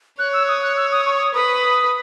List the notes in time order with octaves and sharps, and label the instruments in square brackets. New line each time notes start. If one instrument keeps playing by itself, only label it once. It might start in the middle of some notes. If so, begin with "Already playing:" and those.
[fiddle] C#5 [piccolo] F#6
[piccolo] E6
D#6
F#6
E6
D#6
C#6
D#6
[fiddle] B4 [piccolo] D#6